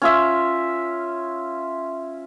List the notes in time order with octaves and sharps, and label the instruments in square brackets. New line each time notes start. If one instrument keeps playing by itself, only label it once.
[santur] C#4 F4 E5